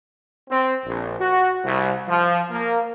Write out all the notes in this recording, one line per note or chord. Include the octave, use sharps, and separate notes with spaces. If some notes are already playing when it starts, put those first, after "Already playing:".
C4
A#1
F#4
C2
F3
A#3